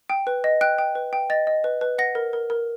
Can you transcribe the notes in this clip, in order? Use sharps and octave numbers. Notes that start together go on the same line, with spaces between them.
G5
B4
D#5
G5 F#6
G5
B4
G5
D#5 A6
D#5
B4
B4
F#5 A#6
A#4
A#4
A#4